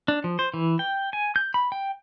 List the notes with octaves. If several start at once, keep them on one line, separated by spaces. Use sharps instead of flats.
D4
F3
C5
E3
G5
G#5
G6
B5
G5